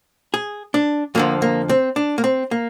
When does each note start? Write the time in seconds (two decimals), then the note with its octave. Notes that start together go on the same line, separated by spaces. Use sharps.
0.34 G#4
0.74 D4
1.15 F2 D3 F3 A#3
1.42 A#3
1.69 C4
1.96 D4
2.18 A#3
2.24 C4
2.51 A#3